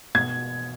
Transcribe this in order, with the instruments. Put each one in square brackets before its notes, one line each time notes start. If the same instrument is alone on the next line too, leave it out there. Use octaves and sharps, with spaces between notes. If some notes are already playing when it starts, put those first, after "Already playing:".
[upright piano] B2 G#6